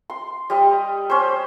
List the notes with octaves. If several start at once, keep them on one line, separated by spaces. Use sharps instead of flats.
C6
G3 D#5
C#4 C5